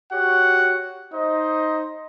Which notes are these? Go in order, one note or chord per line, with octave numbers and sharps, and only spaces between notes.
F#4 G4 C#5 F#5
D#4 C5 D#5